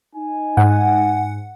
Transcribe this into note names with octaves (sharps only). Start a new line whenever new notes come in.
D#4 G#5
G#2 F#5